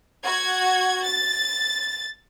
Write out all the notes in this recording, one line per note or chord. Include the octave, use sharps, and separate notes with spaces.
F#4 G#6
A6